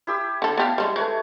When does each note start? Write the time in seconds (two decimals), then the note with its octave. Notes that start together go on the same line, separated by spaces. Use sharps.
0.07 E4 G4 E6
0.42 D3 A4
0.57 B3 G4 F5 A5
0.78 G3 G#3
0.96 G#3 A3 B4 C#5